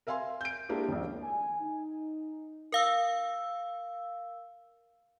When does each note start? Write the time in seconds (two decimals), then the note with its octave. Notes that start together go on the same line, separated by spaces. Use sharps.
0.07 A#4 E5 F5 G#5 C6
0.41 G6 D7
0.69 G#3 A#3 D4 E4 G4
0.89 D#1 A#1
1.23 G#5
1.60 D#4
2.72 A#4 F5 E6